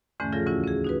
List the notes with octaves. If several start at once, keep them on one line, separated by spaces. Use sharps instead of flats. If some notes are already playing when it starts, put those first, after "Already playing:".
E2 G#2 D3 E3 A3 C#4
C#3 F3 F4 G#4 A4 A#6
D2 E3 C#4 E4 F#4
C#4 G#4
D#4 F#4 B4